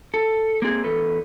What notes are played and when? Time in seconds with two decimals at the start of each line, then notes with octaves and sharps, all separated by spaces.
0.14 A4
0.62 A#3 C4 G#4
0.84 E2 A4 B4